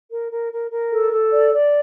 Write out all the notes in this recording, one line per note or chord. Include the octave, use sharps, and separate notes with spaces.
A#4
A#4
A#4
A#4
A4
A4
D5
D5